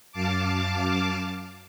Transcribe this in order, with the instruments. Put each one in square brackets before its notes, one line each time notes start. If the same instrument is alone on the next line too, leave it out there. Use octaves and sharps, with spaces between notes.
[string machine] F#2 F5 A5 D6